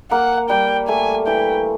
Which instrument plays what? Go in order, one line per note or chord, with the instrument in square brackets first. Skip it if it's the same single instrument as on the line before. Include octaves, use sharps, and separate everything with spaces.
[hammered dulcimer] A#3 [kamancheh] F#5
[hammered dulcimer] G3 [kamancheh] G5
[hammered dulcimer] A3 [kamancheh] G#5
[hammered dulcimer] E3 [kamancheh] G5